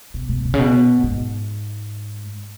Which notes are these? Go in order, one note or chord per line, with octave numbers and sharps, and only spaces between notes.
B2
B2
B2
C#3
B2
G#2